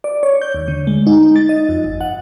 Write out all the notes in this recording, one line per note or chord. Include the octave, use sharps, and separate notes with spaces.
D5
C#5
G6
D#2
D3
G#3
D#4
A6
D#5
F2
G1
F#5